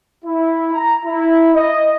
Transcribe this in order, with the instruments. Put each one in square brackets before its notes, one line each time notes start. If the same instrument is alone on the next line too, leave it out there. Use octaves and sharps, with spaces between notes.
[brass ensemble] E4
A#5
E4
D#5